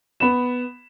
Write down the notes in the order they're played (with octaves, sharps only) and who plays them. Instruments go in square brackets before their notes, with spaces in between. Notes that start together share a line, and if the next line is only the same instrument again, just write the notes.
[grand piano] B3 B5 E7